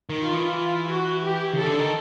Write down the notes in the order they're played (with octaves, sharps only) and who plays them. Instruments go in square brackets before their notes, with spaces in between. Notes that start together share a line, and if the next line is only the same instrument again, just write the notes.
[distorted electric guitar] D#3
[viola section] F4
[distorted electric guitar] E3
[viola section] F4
F#4
G4
[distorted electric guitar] C#3
[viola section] A4
[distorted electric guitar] D3
D#3